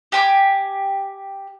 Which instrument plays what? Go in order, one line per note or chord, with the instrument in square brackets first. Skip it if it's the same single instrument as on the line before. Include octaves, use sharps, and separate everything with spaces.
[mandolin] G4 G#5 D6